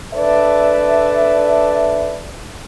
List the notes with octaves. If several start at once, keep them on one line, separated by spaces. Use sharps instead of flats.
D4 A4 B4 D5 E5